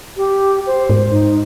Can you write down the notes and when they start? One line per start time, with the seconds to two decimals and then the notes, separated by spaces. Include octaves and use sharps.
0.17 G4
0.67 C5
0.90 G#2
1.11 D#4